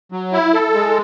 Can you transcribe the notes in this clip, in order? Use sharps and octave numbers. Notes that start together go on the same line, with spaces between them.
F#3
E4
A4
G#3